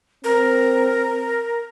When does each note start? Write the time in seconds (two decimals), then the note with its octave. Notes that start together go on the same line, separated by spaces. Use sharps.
0.24 C4 A#4